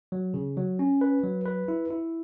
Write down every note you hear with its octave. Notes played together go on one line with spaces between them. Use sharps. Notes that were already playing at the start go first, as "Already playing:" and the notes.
F#3
C#3
F#3
C#4
B4
F#3
B4
E4
E4